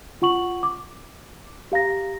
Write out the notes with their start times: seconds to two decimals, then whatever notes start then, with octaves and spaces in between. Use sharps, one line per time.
0.22 F4 F#5 C#6 F#7
0.63 D6
1.72 G4 F5 A#5 A#6